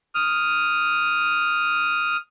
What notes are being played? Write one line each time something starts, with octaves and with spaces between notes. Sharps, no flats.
D#6 F6